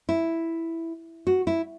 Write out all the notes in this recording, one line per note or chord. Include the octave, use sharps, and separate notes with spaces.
E4
F#4
E4